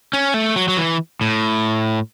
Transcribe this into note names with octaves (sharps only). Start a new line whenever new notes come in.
C#4
A3
F#3
F#3
E3
A2